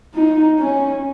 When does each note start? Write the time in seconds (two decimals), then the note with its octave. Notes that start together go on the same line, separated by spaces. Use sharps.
0.15 D#4
0.59 C#4